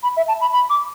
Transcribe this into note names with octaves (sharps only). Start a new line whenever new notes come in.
B5
E5
A5
B5
B5
D6